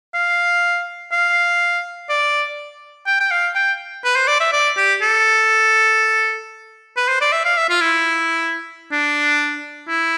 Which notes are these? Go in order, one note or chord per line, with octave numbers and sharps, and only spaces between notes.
F5
F5
D5
G5
G5
F5
G5
B4
C5
D5
E5
D5
G4
A4
B4
C5
D5
E5
F5
E5
F4
E4
D4
E4